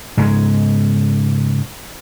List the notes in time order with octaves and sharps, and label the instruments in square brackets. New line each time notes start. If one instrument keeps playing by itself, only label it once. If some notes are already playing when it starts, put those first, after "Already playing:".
[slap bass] G#2 C#3 G#3